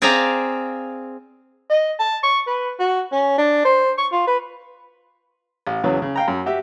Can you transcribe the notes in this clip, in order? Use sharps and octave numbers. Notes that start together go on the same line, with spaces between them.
C4 G#4 D5 E5 F5 A#5
D#5
A5
C#6
B4
F#4
C#4
D4
C5
C#6
F4
B4
A1
E2 C#3 E3 F#3
C#3
F5 G5 A#5
F#2
F#4 G4 E5